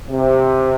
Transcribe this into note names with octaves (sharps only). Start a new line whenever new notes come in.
C3